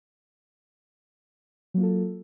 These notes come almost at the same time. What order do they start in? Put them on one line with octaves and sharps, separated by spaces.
F#3 A#3 F4 A4